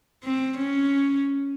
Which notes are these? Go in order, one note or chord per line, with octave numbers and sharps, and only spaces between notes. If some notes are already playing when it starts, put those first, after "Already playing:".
C4
C#4